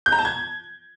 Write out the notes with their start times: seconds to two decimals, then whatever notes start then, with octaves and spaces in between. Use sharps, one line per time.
0.06 G6
0.12 A#5
0.19 A5
0.25 G#6